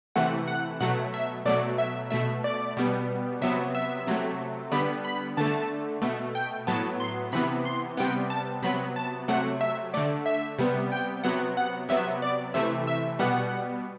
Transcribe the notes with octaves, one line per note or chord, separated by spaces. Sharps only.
C3 E3 A3 F#5
F#5
B2 F#3 A3 F#5
E5
B2 F#3 A3 D5
E5
B2 A3 E5
D5
B2 G3 B3
C3 F#3 B3 E5
E5
C3 F#3 A3
D3 G3 B3 B5
B5
D3 A3 A5
B2 A3
G5
A2 F#3 B3 A5
C6
C3 E3 B3 B5
C6
C3 G3 B3 G5
A5
C3 F#3 B3 B5
A5
C3 F#3 A3 F#5
E5
D3 A3 D5
E5
C3 G3 B3
G5
C3 F#3 B3 F#5
F#5
C3 F#3 B3 E5
D5
C3 E3 A3 E5
E5
B2 G3 B3 F#5